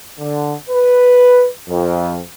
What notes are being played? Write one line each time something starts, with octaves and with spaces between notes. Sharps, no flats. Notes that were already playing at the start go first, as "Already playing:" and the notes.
D3
B4
F2